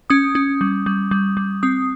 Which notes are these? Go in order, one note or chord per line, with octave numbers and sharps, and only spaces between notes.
C#4 D#6
C#4
G3
G3
G3
G3
C4 D#6